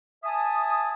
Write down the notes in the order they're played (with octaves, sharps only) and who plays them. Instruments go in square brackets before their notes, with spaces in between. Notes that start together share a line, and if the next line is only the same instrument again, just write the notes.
[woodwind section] E5 G#5 A5 D#6